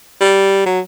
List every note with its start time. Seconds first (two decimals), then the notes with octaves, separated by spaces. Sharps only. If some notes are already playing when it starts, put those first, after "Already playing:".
0.21 G3
0.66 F#3